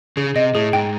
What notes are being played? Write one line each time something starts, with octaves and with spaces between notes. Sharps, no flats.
C#3 G#4
C3 D#5
A2 G#4
G#2 G5